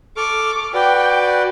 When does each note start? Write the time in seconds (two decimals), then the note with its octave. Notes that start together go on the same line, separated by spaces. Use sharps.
0.17 A4 C#6 D6 F6
0.74 F#4 B4 D5 G5